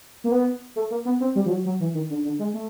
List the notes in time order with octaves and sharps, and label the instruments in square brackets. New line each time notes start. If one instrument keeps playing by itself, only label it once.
[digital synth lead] A#3
B3
A3
A#3
B3
C4
G3
F3
F#3
F#3
E3
D#3
D3
D3
G#3
A3